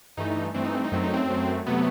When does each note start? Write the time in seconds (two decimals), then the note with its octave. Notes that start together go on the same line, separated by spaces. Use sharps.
0.17 G2 E3 A3 D#4
0.54 G2 E3 A3 C4
0.65 D#4
0.74 C4
0.84 D#4
0.92 F#2 F#3 A3 C4
1.03 D#4
1.13 C4
1.30 F#2 F#3 A3
1.66 C3 F#3 A3 B3